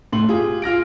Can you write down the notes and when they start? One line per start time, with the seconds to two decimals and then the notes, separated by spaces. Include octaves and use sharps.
0.13 A2 A3 C6 F#7
0.29 F4 G4 G#4
0.62 F4 F6 A#6 D7